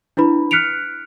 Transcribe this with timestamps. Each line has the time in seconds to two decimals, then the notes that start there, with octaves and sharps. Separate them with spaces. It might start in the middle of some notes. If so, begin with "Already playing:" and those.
0.17 D4 E4 B4 B5
0.51 F6 F#6 B6 C#7 D7 F7